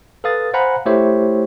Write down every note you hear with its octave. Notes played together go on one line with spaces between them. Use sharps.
A4 B4 F5 D#6 A6
C5 F5 F#5 G#5 A#5 B5
A3 E4 G4 C5 C#5 E5